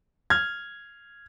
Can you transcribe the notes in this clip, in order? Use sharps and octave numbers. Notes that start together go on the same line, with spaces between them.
F6 G#6